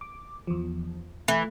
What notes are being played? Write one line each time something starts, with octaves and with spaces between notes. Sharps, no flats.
D6
E2 F3
E3 A3